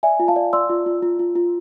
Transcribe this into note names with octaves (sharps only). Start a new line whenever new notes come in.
D5 E5 G#5
F4
F5 A5
D5
D5 C6 E6
F4
F4
F4
F4
F4